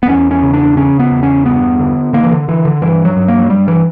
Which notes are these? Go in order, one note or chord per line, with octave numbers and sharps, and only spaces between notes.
B3
E2 C#4
C#4
C#3
D4
C#3 C#4
B3
E2
C#4
G2 B3
D3
D3 A#3
E3
D3
D3 E3
D3
G2 E3
F#3
G2
A#3
F#3
G2 G3
E3